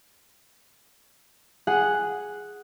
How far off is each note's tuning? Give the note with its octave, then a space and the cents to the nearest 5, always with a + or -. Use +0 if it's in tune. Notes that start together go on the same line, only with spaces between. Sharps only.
G#4 +0 F#5 +0